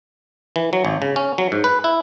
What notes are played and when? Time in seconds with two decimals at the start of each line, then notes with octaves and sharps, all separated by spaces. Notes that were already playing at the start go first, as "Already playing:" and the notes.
0.56 E3
0.73 F#3
0.85 G#1
1.02 C#3
1.16 C#4
1.38 F#3
1.52 G#2
1.64 B4
1.84 E4